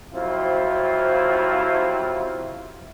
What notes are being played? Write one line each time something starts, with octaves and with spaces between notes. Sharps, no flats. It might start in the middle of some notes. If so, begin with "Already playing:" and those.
F2 C3 F#3 E4 F4 C5